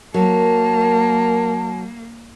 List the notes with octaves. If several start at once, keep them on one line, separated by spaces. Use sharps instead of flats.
F#3 A#3 A#4 A5